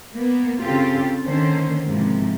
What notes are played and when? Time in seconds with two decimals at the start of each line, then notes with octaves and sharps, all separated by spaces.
0.13 A#3 B3
0.60 C#3 C4 F4 G4 A4
1.25 D3 D#3 A#3 C#4 C5
1.88 G#2 C3 E3 F3 A#3